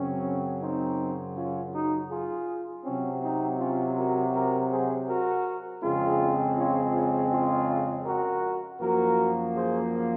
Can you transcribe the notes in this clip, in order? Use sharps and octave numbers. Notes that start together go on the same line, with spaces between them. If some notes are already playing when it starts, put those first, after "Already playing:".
Already playing: F#2 C#3 F#3 C4 C#4
C4 D#4
C#4 F4
D#4 F#4
F4 G#4
C3 F#3 C4 C#4
C4 D#4
C#4 F4
F#4 A#4
F#4 A#4
G#4 C5
F#4 A#4
F2 C#3 G#3 C4 F4 G#4
C#4 F4
C#4 F4
F4 G#4
F#4 A#4
F#2 F3 A#3 F#4 A#4
G#4 C5